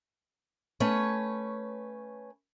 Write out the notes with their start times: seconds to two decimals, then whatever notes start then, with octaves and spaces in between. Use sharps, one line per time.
0.80 A3 C#4 B4 C#5